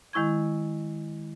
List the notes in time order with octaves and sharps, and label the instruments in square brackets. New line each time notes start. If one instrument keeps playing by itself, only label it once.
[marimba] D#3 G#3 E4 C#6 G#6